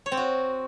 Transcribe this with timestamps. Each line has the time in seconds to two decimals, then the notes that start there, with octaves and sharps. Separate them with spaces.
0.06 C#5
0.12 C4
0.17 F#4